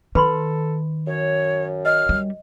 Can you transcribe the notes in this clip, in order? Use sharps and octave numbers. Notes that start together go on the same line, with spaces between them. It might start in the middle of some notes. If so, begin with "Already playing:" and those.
D#3 A4 B4 B5 C6
F#2 C#5
D#5 F6
G3